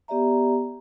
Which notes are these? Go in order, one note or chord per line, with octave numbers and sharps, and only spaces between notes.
B3 G4 D5 E5 A#5